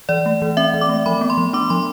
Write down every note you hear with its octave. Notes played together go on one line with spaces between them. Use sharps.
E3 D5
A3
E3
C4 E5
E3
D6
A3
F3 B5
B3
C6
F3
D4 D6
F3 C6